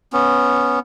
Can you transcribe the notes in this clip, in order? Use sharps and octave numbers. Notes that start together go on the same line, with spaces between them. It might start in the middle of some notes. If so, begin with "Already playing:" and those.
B3 C#4